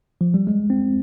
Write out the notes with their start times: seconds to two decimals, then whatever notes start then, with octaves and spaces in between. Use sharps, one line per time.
0.21 F3
0.34 G3
0.47 G#3
0.70 C4